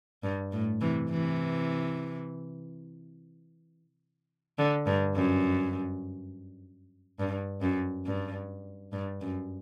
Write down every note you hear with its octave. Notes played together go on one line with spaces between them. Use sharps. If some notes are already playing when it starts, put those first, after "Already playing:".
G2
A2
C3 E3
C3 E3
D3
G2
F#2
G2
F#2
G2
G2
F#2